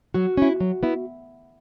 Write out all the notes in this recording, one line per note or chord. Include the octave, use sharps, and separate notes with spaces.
F#3 F#4
C#4 E4
F#3
B3 E4